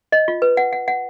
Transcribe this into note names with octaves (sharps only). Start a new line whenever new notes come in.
D#5
F4
B4
F#5
F#5
F#5